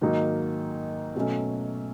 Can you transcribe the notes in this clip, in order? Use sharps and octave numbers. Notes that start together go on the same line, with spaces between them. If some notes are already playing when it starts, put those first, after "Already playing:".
G#2 D#3 F#3 A#3 D#4
B2 F#3 A3 C#4